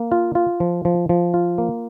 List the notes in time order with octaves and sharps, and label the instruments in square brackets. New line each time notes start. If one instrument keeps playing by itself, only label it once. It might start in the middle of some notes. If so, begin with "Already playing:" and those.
Already playing: [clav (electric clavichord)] A#3
F4
F4
F3
F3
F3
F4
A#3